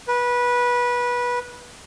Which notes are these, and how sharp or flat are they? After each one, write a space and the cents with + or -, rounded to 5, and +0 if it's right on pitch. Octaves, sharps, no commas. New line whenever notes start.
B4 -20